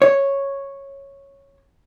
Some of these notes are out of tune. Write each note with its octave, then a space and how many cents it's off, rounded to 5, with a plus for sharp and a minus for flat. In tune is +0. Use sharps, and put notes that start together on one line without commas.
C#5 -5